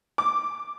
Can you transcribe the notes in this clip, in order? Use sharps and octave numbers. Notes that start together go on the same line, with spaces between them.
D6